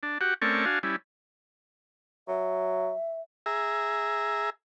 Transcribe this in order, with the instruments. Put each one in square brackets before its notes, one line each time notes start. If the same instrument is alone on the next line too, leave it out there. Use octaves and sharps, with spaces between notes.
[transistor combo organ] D4
F#4 G4 F#5
A3 C4 C#4 A#4 D5 C#6
D4 F#4 F5 G#5
G3 C#4 E4
[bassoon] F#3 [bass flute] E5
[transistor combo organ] G#4 E5 A#5